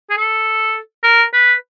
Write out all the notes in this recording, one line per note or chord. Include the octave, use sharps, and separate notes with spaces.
G#4
A4
A#4
B4